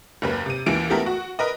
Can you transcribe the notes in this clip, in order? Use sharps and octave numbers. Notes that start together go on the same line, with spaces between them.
F#1 D#2 B4
C3 D#7
D#2 E3 D7
A3 B3 E4 G4 A4 A#4
F#4
A#4 B4 D#5